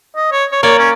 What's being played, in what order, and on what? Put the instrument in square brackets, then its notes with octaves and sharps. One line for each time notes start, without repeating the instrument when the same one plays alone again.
[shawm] D#5
C#5
C#5
[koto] A#3 D5 [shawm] C#5
[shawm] C#4